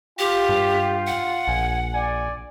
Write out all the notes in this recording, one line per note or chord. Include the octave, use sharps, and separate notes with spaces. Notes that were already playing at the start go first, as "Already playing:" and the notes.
F4 G4 G5
G2
F#5
A#1 G#5
D5 G#5